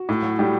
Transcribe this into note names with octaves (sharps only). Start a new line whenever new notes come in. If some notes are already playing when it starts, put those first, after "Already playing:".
Already playing: F#4
A2
F#3
A2 G3 G4